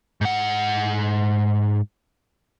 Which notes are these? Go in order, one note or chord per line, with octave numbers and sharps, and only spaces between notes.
G#2 F#5